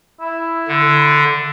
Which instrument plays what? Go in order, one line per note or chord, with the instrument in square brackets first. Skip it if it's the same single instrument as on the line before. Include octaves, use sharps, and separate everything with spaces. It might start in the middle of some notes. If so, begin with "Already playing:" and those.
[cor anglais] E4
[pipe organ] D3